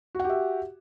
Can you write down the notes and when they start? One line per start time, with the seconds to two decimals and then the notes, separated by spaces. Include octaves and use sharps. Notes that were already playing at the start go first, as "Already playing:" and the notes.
0.15 F#4
0.20 F#5
0.24 G4
0.29 E5